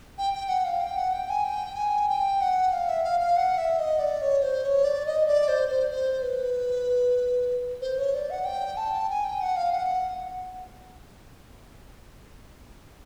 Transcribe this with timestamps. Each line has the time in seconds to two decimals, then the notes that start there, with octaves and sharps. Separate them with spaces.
0.18 G5
0.34 G5
0.49 F#5
0.65 F5
0.81 G5
0.97 F#5
1.12 G5
1.30 G#5
1.44 G5
1.76 G#5
2.09 G5
2.41 F#5
2.72 F5
2.88 E5
3.04 F5
3.20 F5
3.37 F#5
3.58 E5
3.79 D#5
3.99 D5
4.22 C#5
4.42 C5
4.64 C#5
4.84 D5
5.06 D#5
5.26 D5
5.48 C5
5.69 C5
5.91 C5
6.22 B4
7.81 C5
7.98 C#5
8.14 D5
8.30 F#5
8.45 G5
8.77 A5
9.10 G#5
9.25 G5
9.41 F#5
9.56 F5
9.72 F#5